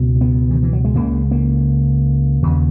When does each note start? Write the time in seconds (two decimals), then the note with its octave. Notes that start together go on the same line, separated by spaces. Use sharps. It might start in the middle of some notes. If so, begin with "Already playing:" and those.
Already playing: C#2 B2
0.21 B3
0.51 D#3
0.63 E3
0.73 F#3
0.84 G#3
0.95 C#2 C#3 A#3
1.31 A#3
2.42 D#2 C#3